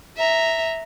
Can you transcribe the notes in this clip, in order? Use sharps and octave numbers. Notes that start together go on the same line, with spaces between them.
E5 A#5